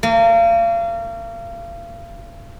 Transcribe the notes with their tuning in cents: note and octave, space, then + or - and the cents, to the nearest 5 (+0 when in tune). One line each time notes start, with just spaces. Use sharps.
A#3 -35